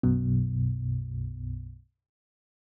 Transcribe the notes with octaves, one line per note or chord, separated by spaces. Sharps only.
B1 F#2 B2